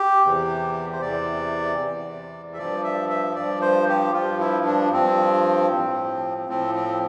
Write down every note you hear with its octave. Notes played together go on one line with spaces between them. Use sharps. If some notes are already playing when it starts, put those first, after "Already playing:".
Already playing: G4
E2 C3 E3
C5
E2 C3 E3 D5
E2 C3 E3
E5
G2 F3 D5
E5
E5
G2 F3 D5
C5
G4
G2 F3 F4
E4
D4
G2 F3 C4
A2 F3
A2 F3 C4
C4